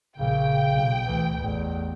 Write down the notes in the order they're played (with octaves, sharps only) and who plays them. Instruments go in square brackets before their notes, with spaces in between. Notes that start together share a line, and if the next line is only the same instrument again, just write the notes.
[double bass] A#1 [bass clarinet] C#3 [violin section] G5
[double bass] B1
[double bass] D2 [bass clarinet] E3
[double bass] A1 [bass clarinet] E2